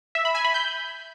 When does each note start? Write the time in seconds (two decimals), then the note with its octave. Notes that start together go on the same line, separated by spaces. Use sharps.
0.15 E5
0.25 B5
0.35 G#5
0.45 B5
0.54 G6